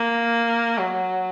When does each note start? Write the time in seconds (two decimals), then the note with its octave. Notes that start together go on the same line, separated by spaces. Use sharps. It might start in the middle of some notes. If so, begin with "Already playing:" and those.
Already playing: A#3
0.78 F#3